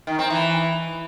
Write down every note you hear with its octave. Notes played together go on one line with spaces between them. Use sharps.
D#3
C4
E3